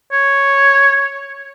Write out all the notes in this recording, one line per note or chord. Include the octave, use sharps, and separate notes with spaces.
C#5